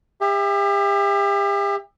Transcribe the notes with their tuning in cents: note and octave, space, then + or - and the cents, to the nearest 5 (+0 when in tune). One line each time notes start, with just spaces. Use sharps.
G4 +40 E5 +0